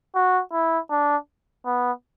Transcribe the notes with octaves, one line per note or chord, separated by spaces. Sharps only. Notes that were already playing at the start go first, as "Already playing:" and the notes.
F#4
E4
D4
B3